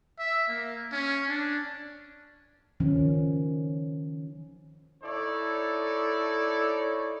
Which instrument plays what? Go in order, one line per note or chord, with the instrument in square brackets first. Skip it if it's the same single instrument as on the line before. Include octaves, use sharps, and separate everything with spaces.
[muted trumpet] E5
A#3
C#4
D4
[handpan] D#3 F3 C#4
[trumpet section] D#4 E4 A4 C#5 D5